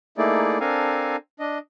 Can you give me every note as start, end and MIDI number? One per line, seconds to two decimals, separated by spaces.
0.18 0.58 57
0.18 0.58 58
0.18 0.58 63
0.18 0.58 64
0.18 0.58 68
0.18 0.58 74
0.60 1.16 60
0.60 1.16 62
0.60 1.16 69
0.60 1.16 70
0.60 1.16 77
0.60 1.16 80
1.39 1.58 62
1.39 1.58 75